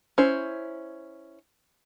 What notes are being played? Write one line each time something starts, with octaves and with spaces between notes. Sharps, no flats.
C#4 E4 C5